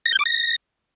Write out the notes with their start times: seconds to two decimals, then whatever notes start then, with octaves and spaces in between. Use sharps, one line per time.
0.06 A#6
0.12 G6
0.19 D6
0.26 A#6